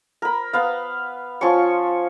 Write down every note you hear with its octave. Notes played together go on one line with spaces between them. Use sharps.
A#4 B5
B3 F5
F3 C#4 C6 C#6